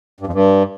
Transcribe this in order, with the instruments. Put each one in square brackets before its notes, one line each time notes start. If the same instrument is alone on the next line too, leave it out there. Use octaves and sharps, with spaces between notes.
[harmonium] G2
F2
G2